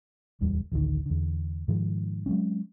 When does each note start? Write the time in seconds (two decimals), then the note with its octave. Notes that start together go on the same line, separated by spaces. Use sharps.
0.41 D1 E2 G3
0.72 A1 D2 D3 D#3
1.06 E2 D3
1.68 G#2 D#3 F3
2.26 F#3 G#3 C4 C#4